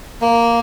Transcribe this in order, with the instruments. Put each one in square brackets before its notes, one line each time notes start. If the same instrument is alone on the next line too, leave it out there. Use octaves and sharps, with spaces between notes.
[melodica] A#3